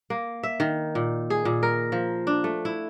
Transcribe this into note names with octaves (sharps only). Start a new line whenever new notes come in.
A#3
E5
D#3
A#2
G#4
A#2
A#4
F3
D4
A3
E4